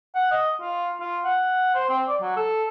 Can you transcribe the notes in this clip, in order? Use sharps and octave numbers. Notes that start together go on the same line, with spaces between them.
F#5
D#5
F4
F4
F#5
C5
C4
D5
F#3
A4